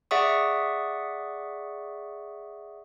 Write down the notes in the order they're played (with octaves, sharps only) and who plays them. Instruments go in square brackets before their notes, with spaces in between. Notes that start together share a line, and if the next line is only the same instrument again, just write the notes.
[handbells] G#4 D5 E5 F#5 C#6 D#6